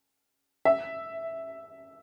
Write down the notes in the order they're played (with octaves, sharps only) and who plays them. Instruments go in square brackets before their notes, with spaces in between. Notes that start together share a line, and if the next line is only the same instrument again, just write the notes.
[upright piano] E5